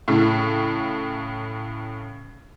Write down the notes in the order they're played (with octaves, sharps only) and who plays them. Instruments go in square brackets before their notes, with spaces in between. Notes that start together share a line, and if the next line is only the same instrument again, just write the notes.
[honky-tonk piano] A2 C#3